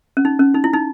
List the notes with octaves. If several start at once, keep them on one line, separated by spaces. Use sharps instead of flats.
C#4
D#4
C#4
D#4
E4
D#4